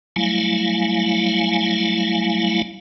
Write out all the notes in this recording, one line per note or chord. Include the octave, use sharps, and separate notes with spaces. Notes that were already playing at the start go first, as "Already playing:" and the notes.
F#3 G3 A3 E4 F5 G#5